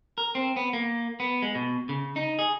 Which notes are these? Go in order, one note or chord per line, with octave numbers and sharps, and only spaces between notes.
A#4
C4
B3
A#3
B3
G#3
B2
C#3
D#4
G#4